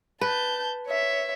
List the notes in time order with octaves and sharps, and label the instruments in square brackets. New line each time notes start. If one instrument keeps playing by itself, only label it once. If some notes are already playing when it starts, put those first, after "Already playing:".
[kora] B4 [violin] A5 G6
[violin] C#5 E5